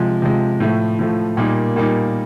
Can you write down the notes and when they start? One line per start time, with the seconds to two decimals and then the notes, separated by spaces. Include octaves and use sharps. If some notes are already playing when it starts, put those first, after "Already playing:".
Already playing: C3 F3 G#3
0.22 C3 F3 G#3
0.60 A2 F3 A3
0.99 A2 F3 A3
1.37 A#2 G3 A#3 D#4
1.76 A#2 G3 A#3 D#4